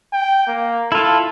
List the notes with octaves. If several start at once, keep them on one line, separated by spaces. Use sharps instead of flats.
G5
A#3
E4 F4 A4